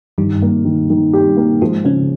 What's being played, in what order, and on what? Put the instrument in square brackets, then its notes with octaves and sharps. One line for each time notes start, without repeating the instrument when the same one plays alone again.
[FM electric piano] G2 G3 [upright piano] D#3
[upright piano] A#3
D#3
D#3
G4
A#3
[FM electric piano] G#2 G#3 [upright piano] F3
[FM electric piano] C#3 C#4 [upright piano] F3